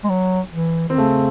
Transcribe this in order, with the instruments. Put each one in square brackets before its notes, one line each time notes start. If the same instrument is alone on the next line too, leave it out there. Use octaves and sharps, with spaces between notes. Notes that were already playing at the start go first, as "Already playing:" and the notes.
[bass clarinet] G#3
F#3
E3
[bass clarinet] D#3 [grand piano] C4
[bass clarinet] C#3 [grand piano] A3